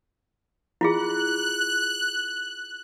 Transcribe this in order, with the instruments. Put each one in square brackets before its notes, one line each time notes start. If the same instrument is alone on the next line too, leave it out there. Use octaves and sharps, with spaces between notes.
[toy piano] E4 F4 G#4 [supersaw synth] F#6